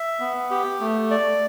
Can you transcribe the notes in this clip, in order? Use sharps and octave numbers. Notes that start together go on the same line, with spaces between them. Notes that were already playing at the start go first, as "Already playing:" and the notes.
Already playing: E5
B3
G4
A3
D5